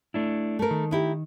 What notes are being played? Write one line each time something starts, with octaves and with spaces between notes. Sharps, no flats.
A3 D4 E4
A3 A#4
D#3
D#4 E4 G4